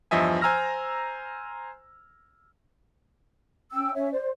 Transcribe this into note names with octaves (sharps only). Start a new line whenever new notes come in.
E2 G2 F3 D#5 E5 G#5
C5 G#5 A#5 E6 F6 A#6
C#4 G5 E6
C#4 C#5 E5
C5 D5